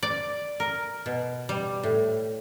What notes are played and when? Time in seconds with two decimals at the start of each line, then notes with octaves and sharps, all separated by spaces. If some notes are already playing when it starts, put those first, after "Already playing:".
0.03 D5
0.60 A#4
1.06 B2
1.49 G3
1.83 A2